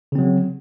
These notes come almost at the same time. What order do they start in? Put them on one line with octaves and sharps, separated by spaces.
C#3 C4 F#3